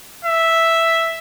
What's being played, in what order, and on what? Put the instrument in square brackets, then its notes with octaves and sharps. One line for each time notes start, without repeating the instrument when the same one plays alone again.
[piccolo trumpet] E5